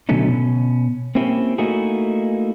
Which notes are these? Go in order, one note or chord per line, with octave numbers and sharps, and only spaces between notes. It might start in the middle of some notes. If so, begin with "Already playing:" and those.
B2 D3 F#3 A3 C#4 D#4
B2 C#4
A#3 C4 C#4 E4 G4
A3 A#3 D#4 E4 F#4 G#4